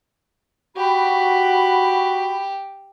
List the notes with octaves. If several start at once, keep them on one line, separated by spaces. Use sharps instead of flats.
F#4 G4 B5